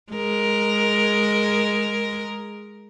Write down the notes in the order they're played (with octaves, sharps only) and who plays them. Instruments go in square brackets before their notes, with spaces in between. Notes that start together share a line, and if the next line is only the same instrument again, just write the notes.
[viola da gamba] G#3 A#4